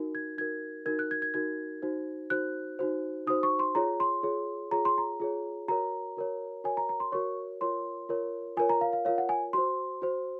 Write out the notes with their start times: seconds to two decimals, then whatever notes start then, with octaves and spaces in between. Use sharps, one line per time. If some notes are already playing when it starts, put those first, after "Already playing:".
Already playing: D#4 F#4 A#4
0.15 G#6
0.38 D#4 F#4 A#4 G#6
0.86 D#4 F#4 A#4 G#6
0.99 F#6
1.11 G#6
1.22 G#6
1.34 D#4 F#4 A#4 G#6
1.82 D#4 F#4 C5
2.30 D#4 F#4 C5 F#6
2.79 D#4 F#4 C5
3.27 D#4 F#4 C5 D#6
3.43 C#6
3.59 C6
3.75 F4 G#4 C#5 A#5
4.00 C6
4.23 F4 G#4 C#5
4.71 F4 G#4 C#5 A#5
4.85 C6
4.98 A#5
5.20 F4 G#4 C#5
5.68 F#4 A#4 C#5 A#5
6.17 F#4 A#4 C#5
6.64 F#4 A#4 C#5 G#5
6.77 A#5
6.89 A#5
7.00 C6
7.12 F#4 A#4 C#5 C#6
7.61 F4 A#4 C#5 C6
8.09 F4 A#4 C#5
8.57 F4 A#4 C#5 G#5
8.69 A#5
8.81 F5
8.93 F5
9.05 F4 A#4 C#5 F5
9.18 F#5
9.29 G#5
9.53 F#4 C5 C6
10.02 F#4 C5